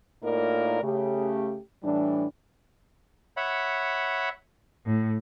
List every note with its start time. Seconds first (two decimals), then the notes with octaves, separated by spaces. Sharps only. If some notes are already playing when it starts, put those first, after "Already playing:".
0.22 A2 A#3 D#4 F4 A#4 D5
0.82 C#3 A3 G4
1.83 A2 E3 G3 D4
3.37 C#5 E5 F#5 B5
4.85 A2